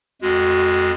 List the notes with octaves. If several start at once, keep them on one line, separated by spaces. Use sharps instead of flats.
F2 G#3 F#4